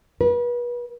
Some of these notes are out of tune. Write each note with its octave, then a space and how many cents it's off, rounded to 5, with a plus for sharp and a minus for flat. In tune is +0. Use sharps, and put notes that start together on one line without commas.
B4 -35